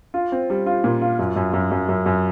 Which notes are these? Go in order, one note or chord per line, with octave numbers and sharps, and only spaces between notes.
F4
C4
G3
F4
A#2
F4
F#2
F#2
F#2
F#2
F#2
F#2